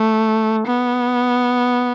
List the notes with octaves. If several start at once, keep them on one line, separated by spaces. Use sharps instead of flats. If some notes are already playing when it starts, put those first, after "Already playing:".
Already playing: A3
B3